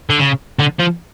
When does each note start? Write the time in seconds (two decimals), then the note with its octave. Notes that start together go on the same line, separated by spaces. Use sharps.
0.10 D3
0.19 C#3
0.59 D3
0.79 F3